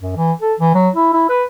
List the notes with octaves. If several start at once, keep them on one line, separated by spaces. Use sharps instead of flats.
F#2
E3
A4
E3
F#3
E4
E4
B4